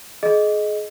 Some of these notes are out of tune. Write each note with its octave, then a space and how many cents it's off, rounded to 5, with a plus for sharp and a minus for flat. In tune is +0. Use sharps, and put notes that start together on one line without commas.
G#4 +30 D#5 +0